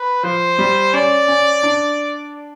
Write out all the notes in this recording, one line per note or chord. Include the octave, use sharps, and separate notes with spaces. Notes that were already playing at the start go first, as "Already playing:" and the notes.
Already playing: B4
F3 C5
G3
C#4 D5
C#4
D4